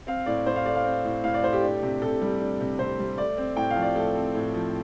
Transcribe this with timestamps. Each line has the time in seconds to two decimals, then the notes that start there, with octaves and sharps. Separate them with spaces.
0.07 C4 F5
0.26 A2 D5
0.46 A2 C5
0.56 F5
0.66 A3 D5
0.75 F5
0.85 C4
1.04 A2
1.24 A2 F5
1.34 D5
1.43 A3 C5
1.53 G4
1.63 D4
1.83 C3
2.02 C3 A4
2.22 G3
2.41 D4
2.60 C3
2.79 C3 C5
2.99 G3
3.18 A3 D5
3.37 C4
3.57 A2 G5
3.70 F5
3.76 F3
3.82 D5
3.96 A3 A4
4.15 C4
4.35 A2
4.54 F3